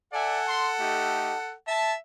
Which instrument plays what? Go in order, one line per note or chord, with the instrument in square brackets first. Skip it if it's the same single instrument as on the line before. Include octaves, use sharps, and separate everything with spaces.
[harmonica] A4 F#5 [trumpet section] D5 E5 G#5
[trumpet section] C6
A3 D#4 G4
[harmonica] E5 [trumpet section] A5